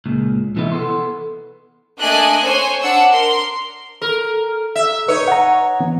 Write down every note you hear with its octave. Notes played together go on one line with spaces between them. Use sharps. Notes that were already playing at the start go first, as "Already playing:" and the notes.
C#2 A#2
C3 E3 F3 B3 D#4 E4
B3 A4 C6
A3 A#3 D4 D#5 G#5 F#6
C5 C#5 G#5
D4 F#5 E6 C#7
A#4 C6
A4 A#4
E5
D#4 B4 C#5
F#5 A#5
E3 B3